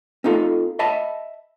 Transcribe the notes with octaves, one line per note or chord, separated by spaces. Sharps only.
C4 D#4 F4 A4
D#5 E5 A5 B5